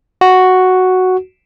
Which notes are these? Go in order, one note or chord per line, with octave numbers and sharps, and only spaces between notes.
F#4